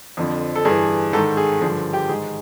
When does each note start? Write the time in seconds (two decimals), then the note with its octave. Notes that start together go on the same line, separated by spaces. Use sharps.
0.17 F2 D3 F3
0.56 A4
0.65 G2 E3 G#4
1.13 G#2 D#3 A4
1.37 G#4
1.61 G2 D3 F3 G#4
1.93 G4
2.09 G#2 D#3 G#4